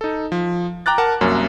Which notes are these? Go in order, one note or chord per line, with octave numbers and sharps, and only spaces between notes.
D#4 A4
F3
G5 A#5 D6 F#6 A6
A#4 F#5 A5
C2 F#2 A#3 C#4 F#4